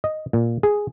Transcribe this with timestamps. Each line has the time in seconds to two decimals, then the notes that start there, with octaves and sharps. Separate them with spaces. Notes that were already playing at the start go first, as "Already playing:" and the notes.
0.04 D#5
0.33 A#2
0.63 G#4